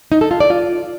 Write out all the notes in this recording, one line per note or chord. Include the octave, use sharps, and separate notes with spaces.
D#4
A4
F4
D5
F4